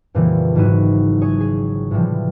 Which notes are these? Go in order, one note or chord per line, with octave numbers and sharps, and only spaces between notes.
F2 A#2 C#3 E3 G3
G#1 G#2 F#3 E4 F#4 D#7
G#4 C#5 D#6 G#6 D#7
G#4
A2 C3 E3 F3 G3